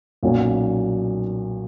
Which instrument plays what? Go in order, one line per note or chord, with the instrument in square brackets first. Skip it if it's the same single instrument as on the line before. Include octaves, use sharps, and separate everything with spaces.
[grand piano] B1 A#2 F#3 A#3 C#4